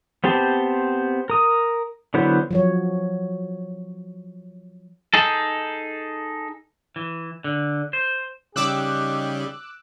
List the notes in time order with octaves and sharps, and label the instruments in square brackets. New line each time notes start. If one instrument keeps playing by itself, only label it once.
[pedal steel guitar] B3 C4 G4 C5 A5
A#4 D#6
D3 F#3 B3 E4 C5
[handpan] F3 F#3 C#5
[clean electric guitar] D#4 G#4 A4
E3
D3
C5
[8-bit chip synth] C#3 G3 [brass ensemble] D#4 G4 [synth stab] D6 E6 F#6